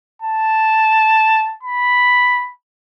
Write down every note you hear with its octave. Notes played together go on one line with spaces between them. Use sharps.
A5
B5